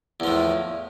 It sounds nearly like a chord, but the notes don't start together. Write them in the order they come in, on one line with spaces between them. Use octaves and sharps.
E2 F3 A2